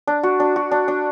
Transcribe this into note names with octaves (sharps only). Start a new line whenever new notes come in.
D4
F#4
D4
F#4
D4
D4